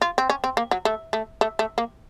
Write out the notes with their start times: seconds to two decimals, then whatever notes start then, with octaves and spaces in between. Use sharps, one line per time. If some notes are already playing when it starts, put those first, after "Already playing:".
0.02 F4
0.18 C4
0.30 C#4
0.44 C4
0.57 A#3
0.71 F#3
0.85 A3
1.13 A3
1.41 A3
1.59 A3
1.78 A#3